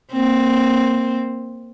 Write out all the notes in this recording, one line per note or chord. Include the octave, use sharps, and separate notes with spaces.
A#3 C4